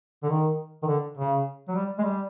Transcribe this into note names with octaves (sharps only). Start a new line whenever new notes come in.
D3
D#3
D#3
D3
C#3
F#3
G3
G#3
G3